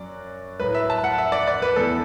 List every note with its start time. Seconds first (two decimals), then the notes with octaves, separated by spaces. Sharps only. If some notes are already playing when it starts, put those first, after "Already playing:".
Already playing: F#2 F#3 D5
0.60 A2 F#3 B4
0.75 E5
0.90 A5
1.04 F#5
1.18 E5
1.32 D5
1.48 D5
1.62 B4
1.76 E2 E3 A4